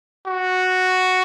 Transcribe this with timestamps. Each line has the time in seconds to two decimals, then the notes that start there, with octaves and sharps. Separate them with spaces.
0.27 F#4